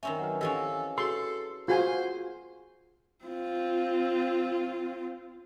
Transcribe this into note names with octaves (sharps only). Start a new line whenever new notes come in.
D#3 C4 C#4 E5
F#3 B4 F#5
E3 F3 C#4 G4 A4 D#5
F#4 G#4 A4 C6
F4 F#4 G#4 C5 G#5
C4 F4